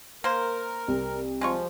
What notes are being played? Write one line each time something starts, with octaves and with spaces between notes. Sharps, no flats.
A#3 A#4 C5
C2
F3 G#3 F4 C#6